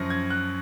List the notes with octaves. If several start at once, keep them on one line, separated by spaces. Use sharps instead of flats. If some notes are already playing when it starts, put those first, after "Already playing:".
Already playing: F#2 F3 A#6
G#6
F#6